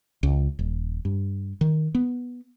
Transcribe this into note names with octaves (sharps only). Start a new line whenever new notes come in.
C#2
D#1
G2
D#3
B3